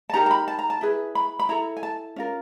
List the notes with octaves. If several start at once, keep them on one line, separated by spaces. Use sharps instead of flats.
A5
D#4 G4 A#4 A#5
A#5
B5
A5
A#5
A5
E4 G#4 B4
B5
B5
E4 A4 A#5
G#5
A5
C#4 F4 A#4